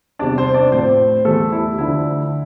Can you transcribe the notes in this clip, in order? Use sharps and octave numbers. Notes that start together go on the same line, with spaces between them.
E2 C3 G3 D4 D5
C4 C5
D4 D5
A2 F3 C4 C5
E2 E3 G3 A3 A4
E4
D2 D3 F3 E4